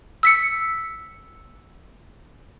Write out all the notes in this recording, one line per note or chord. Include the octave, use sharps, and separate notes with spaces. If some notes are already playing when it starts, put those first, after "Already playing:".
E6 B6 C#7